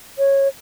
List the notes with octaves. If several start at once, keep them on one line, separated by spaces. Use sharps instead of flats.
C#5